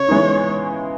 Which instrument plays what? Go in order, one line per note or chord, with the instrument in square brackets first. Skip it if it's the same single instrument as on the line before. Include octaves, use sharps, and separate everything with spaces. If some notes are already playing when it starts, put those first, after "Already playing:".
Already playing: [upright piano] C#3 [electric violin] C#5
[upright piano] E3 G#3 B3 D#4